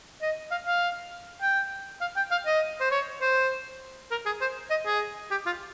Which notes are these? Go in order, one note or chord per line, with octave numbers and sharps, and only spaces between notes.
D#5
F5
F5
G5
F5
G5
F5
D#5
C5
C#5
C5
A#4
G#4
C5
D#5
G#4
G4
F4